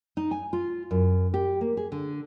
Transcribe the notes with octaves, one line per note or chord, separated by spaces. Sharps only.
D#4
G#5
F4
F#2
G4
A#3
G#4
D3